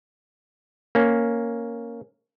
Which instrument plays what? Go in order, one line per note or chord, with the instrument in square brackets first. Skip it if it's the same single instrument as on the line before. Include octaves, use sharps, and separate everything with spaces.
[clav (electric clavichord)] A#3 C#4